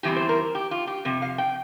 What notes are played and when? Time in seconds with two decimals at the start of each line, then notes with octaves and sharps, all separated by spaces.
0.03 E2 E3 G3 C4 G4
0.16 C5
0.29 A#4
0.55 G4
0.71 F4
0.87 G4
1.05 F2 C3
1.22 F5
1.38 G5